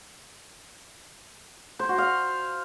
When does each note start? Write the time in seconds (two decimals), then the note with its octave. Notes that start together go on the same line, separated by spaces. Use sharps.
1.79 C5
1.89 F#4
1.98 F5